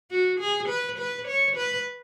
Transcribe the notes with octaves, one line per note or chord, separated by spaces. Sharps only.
F#4
G#4
B4
B4
C#5
B4